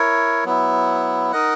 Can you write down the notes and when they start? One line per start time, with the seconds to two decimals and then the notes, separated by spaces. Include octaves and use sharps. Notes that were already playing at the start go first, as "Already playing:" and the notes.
Already playing: E4 A#4 C#5
0.44 F#3 B3 E4
1.32 D#4 A#4 D#5 F#5